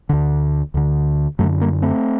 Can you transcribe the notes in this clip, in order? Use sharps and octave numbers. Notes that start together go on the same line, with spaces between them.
D2 D3
D2 D3
F#2 D3 F#3 A3
G3 A#3
A3 C4